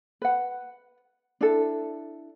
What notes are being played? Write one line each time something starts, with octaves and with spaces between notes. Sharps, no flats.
B4 F#5
D4 E4 A4